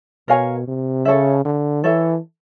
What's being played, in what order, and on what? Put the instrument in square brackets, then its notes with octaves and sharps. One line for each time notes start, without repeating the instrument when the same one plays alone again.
[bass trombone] B2 [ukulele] A#4 C#5 F5 G#5
[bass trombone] C3
[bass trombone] C#3 [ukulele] A4 C#5 E5
[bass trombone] D3
[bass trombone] E3 [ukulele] A4 C#5 E5